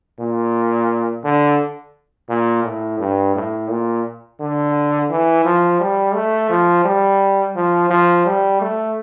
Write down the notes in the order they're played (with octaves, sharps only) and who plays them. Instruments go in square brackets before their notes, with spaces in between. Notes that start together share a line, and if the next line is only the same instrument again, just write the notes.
[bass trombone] A#2
D3
A#2
A2
G2
A2
A#2
D3
E3
F3
G3
A3
F3
G3
F3
F3
G3
A3